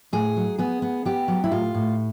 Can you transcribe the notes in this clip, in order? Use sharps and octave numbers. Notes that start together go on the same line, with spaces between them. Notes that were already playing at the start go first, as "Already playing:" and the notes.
A2 G#4
F#3
B3 G#4
B3
B3 G4
F#3
E4
A2 F4
A2